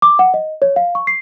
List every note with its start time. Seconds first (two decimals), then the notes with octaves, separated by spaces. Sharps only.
0.02 D6
0.19 F#5
0.34 D#5
0.62 C#5
0.76 F5
0.95 C#6
1.07 C7